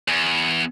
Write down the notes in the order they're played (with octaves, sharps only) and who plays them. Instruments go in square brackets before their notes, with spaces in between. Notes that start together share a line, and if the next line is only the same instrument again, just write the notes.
[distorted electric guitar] E2